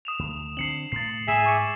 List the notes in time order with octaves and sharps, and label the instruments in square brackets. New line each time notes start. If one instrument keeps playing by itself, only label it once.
[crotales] D#6 E7 F7
[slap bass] D2
[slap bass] D3 C4 [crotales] C7 C#7 F#7
[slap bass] A2 [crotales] A6 C7
[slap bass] G#2 [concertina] G#4 E5 G#5 [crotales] B6 E7
[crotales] C#6 D6 C#7